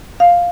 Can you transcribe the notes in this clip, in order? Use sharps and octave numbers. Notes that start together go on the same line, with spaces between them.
F5